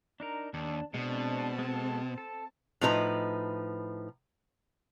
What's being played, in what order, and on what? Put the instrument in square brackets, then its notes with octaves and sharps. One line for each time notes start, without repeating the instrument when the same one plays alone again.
[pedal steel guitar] D4 D#4 A#4
[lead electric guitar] D#2 [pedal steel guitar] D4
[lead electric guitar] B2 [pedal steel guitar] G#3 D4 [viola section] C4 A5
[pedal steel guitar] G#3 A4
A4
[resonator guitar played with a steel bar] A2 F3 D#4 B4 A#5